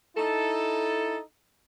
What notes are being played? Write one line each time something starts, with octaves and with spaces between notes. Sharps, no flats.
D#4 E4 A4